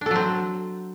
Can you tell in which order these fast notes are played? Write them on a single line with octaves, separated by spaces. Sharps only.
D4 A4 F#3 C4